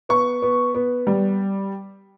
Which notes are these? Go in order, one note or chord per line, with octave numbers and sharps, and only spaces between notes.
B3 C#6
B3
B3
G3